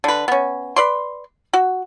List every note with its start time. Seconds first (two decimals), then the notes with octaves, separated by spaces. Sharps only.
0.04 D3 B4
0.28 B3 C#4
0.76 B4 D5 C6
1.53 F#4